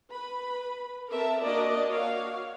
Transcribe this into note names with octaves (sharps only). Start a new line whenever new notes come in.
B4 B5
C4 A4 A#4 E5 A5
A#3 D4 F#4 A#4 D5 D#5
F#4 C#5 F5